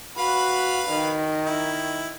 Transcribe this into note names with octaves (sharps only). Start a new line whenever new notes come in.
F#4 B4 F5 B5
D#3
E4